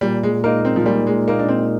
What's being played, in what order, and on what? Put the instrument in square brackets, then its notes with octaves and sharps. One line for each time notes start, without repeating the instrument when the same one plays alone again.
[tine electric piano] A#2 [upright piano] G3
[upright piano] G#3
[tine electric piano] G#3 D#4 A#4 [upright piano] A#3
[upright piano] C4
F3
[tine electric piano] A#2 [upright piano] G3
[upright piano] G#3
[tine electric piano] G#3 D#4 A#4 [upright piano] A#3
[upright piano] D4
C4